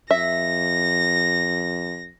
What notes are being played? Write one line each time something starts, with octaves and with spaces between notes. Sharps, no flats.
F2 E5 A#6